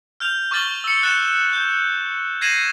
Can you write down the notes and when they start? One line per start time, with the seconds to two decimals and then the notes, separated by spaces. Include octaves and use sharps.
0.20 F6 G6 F7
0.51 C#6 D6 F6 A6 F#7 G7
0.84 E6 C#7
1.03 F#6 A6 C#7 E7
1.53 G6
2.41 G#6 A#6 C7 D#7 E7 F#7